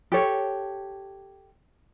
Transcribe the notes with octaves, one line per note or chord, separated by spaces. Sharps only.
G4 A4 C#5